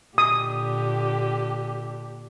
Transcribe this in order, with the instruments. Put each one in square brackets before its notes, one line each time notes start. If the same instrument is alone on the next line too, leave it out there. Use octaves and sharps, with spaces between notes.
[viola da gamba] A#2 D3 [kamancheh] G4 [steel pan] D#6